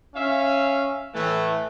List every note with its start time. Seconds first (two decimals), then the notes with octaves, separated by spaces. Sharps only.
0.14 C#4 E5 F5
1.14 A2 E3 A3